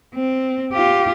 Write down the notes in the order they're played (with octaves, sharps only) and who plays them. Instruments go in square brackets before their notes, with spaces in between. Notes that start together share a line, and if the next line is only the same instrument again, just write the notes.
[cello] C4
F4 G4